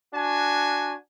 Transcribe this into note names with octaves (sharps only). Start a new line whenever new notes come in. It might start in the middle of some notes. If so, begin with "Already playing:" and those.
D4 F#4 G#5